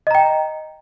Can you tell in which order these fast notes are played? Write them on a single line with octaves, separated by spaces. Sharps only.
D#5 A#5 G5